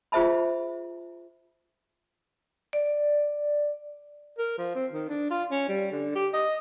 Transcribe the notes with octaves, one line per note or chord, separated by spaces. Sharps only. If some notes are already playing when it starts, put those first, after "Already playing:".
F4 G#4 C5 E5 A5 B5
D5
A#4
F3
C4
D#3
D4
F4
C#4
G3
D3
G4
D#5